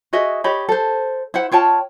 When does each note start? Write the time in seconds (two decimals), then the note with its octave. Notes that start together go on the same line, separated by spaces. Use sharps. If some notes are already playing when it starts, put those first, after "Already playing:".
0.13 F#4 G#4 D#5 E5
0.44 G4 C#5 D#5 B5
0.69 A4 C5
1.34 E4 C5 F#5
1.52 F4 C#5 G5 A5